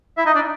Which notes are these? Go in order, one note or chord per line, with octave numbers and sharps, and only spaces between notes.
E4 E5
D#4 D#5
D4 D5